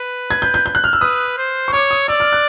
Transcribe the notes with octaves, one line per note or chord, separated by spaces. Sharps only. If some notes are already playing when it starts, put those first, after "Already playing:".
Already playing: B4
G#6
G6
G6
G6
F#6
F6
E6
B4 D#6
C5
C#6
C#5 D6
D#6
D5 E6
F6
F#6